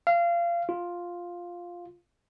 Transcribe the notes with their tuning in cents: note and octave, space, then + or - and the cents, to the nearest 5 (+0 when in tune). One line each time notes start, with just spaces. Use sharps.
F5 -25
F4 +5